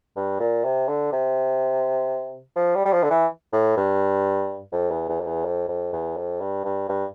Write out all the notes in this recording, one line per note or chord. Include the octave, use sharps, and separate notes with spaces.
G2
A#2
C3
D3
C3
F3
G3
G3
F3
D3
E3
A2
G2
F2
E2
E2
F2
E2
F2
F2
E2
F2
G2
G2
G2